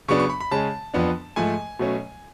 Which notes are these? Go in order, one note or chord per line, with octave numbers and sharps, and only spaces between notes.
C#3 F#3 B3 D4 C#6
C#6
B5
B5
C#3 G#3 C#4 A5
F2 F3 B3 D4
G#2 F3 A3 G#5
B2 F#3 A3 C#4